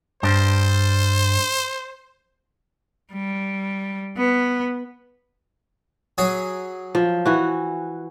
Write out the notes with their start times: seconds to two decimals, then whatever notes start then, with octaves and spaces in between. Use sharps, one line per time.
0.23 G2 D4 C5
3.13 G3
4.17 B3
6.18 F#3 G#4
6.95 F3
7.25 E3 F#4